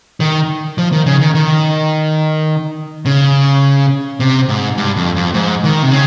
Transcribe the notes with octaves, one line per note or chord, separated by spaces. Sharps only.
D#3
F3
D#3
C#3
D#3
D#3
C#3
C3
G#2
G2
F2
F2
G#2
D#3
C3
C#3